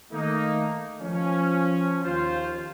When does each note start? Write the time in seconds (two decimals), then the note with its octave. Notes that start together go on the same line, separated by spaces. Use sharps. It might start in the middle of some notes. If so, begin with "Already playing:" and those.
0.12 D#3 A3 A#3 D#4
1.02 F3 C#4
2.04 D#2 F4 C5